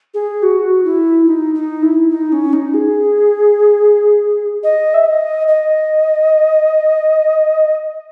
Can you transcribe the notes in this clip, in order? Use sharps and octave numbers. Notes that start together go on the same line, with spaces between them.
G#4
F#4
E4
D#4
D#4
E4
D#4
C#4
D#4
G#4
D#5
E5
D#5
D#5